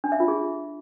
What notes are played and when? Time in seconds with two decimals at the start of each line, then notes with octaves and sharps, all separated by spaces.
0.04 D4
0.12 E5
0.20 F4
0.28 G#4